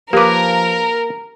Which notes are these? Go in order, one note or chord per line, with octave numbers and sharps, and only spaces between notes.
F3 A#3 G4 A#4 B4 D6